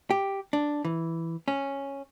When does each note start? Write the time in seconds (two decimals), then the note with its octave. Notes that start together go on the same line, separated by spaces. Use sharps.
0.10 G4
0.53 D4
0.85 E3
1.48 C#4